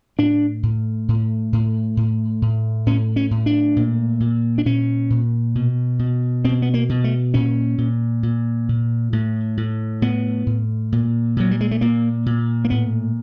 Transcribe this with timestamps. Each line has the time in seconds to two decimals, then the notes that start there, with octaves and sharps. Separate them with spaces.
0.19 A2 D4
0.63 A2
1.08 A2
1.53 A2
1.97 A2
2.42 A2
2.86 A2 C#4
3.16 C#4
3.31 A2
3.46 D4
3.76 A#2
4.20 A#2
4.58 D4
4.66 A#2 C#4
5.10 A#2
5.55 B2
5.99 B2
6.44 B2 C4
6.62 B3
6.74 A#3
6.89 B2
7.04 A3
7.34 A#2 C#4
7.78 A#2
8.23 A#2
8.69 A#2
9.13 A2
9.57 A2
10.02 A2 B3
10.46 A2
10.92 A#2
11.37 A#2 F#3
11.51 G3
11.61 G#3
11.71 A3
11.81 A#2 A#3
12.26 A#2
12.65 A#3
12.70 A2 B3